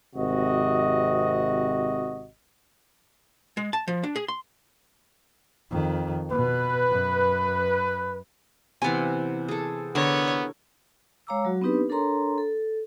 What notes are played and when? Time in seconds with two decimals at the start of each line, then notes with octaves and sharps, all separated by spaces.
0.15 G#1 C3 F#4 D#5
3.57 G#3
3.73 A5
3.88 F3
4.03 D4
4.16 G#4
4.28 C6
5.70 F2 D#3
6.30 B2 B4
6.90 F#2
8.82 C3 E3 B3 G#5
9.48 G#4 A4
9.95 D3 B3 A#4 C#5
11.27 G#3 C#5 F5 A#5 D6 E6
11.45 F#3 F#4
11.61 B3 C4 D4 D#4 G4 B4
11.89 D4 A4 A#4 C#5 A#5 C6
12.38 A4